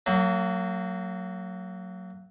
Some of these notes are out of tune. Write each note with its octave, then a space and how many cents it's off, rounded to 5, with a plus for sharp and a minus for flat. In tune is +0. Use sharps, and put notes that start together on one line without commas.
F#3 +0 A#3 -40